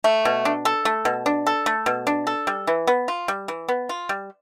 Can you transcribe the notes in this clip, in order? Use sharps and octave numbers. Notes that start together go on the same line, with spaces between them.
A3
B2
D4
A4
A3
B2
D4
A4
A3
B2
D4
A4
G3
E3
B3
F4
G3
E3
B3
F4
G3